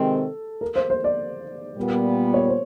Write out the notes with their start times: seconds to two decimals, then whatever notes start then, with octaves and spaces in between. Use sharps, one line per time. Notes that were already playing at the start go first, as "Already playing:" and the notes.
Already playing: C3 D#3 G#3 C4 A4
0.61 A#4
0.76 C5
0.90 C5
1.04 D5
1.76 A#2 G3 B3
2.34 C#5
2.48 C5